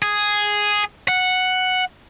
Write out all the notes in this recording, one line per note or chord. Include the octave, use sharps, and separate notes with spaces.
G#4
F#5